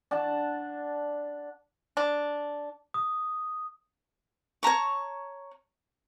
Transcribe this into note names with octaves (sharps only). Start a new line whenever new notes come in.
D4 F#5 A5
D4
D#6
C#5 A5 A#5 C#6